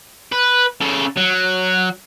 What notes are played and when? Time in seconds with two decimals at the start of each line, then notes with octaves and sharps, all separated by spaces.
0.32 B4
0.81 C#3 A4
1.17 F#3